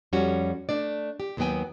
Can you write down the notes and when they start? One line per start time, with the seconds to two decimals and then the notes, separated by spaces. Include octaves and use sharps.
0.13 F2 G3 C#4 F#4
0.69 A3 D4 D5
1.20 G4
1.37 D#2 D#3 F#3 B3 G5 G#5